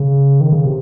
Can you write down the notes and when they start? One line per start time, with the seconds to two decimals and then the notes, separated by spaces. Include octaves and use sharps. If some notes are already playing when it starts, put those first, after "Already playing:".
Already playing: C#3
0.40 D#3
0.52 C#3
0.65 C3